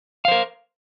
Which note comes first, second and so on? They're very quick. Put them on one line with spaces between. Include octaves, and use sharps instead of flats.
F5 C5 A#4